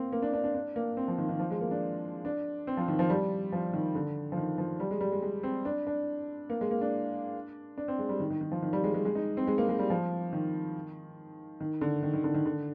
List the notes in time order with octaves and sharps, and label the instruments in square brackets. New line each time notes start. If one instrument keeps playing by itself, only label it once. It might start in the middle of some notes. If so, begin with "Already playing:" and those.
Already playing: [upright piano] A#3 C4
A#3
D4
D4
D4
D4
A#3
C4
F3
D#3
D#3
F3
G#3
A#3
D4
D4
C4
F3
D#3
F3
G3
F3
D#3
D3
F3
D#3
F3
G3
G#3
G3
G#3
G#3
C4
D4
D4
A#3
G#3
A#3
D4
D4
C4
G#3
G3
D#3
D#3
D#3
F3
D#3
G3
G#3
G#3
G#3
D#4
C4
G#3
A#3
G#3
G3
F3
D#3
D#3
D3
D#3
D#3
D3
D#3
D3